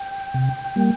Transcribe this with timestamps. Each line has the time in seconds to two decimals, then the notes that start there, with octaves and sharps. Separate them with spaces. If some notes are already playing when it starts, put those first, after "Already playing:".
Already playing: G5
0.34 C3
0.76 G3 A#3